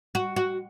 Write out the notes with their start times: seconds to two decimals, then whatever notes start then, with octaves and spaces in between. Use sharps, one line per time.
0.15 F#4
0.36 F#4